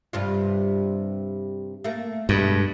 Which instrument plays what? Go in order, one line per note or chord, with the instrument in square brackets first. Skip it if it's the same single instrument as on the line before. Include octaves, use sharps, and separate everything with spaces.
[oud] G2 C3 F4
A3 A#3
[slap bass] G2 [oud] B2 G#3 A3